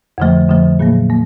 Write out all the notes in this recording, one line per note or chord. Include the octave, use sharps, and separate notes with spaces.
F2 D3 F3 A3
F2 D3 F3 A3
A#2 F#3 A#3
A#3